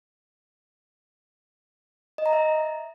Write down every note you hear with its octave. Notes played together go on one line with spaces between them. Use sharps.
D#5
A#5
E5